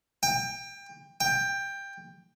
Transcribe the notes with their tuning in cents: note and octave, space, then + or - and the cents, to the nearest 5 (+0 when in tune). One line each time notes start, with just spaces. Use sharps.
G5 +25
G5 +15